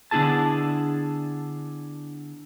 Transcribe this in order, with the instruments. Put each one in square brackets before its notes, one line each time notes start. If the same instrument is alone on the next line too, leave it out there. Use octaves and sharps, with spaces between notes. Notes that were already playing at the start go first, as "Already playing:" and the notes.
[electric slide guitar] D3 B3 D4 E4 G#4 A5